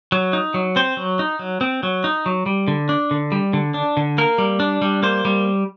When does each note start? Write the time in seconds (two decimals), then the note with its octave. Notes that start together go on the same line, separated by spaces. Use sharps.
0.12 F#3
0.33 D#4
0.54 F#3
0.76 C4 C5
0.97 F#3
1.19 D#4
1.39 F#3
1.61 C4
1.83 F#3
2.04 D#4
2.26 F#3
2.46 G3
2.68 D3
2.89 D4
3.11 D3
3.32 G3
3.53 D3
3.74 D4
3.97 D3
4.18 A#3 A#4
4.38 G3
4.60 D4
4.82 G3
5.03 A#3 C5
5.25 G3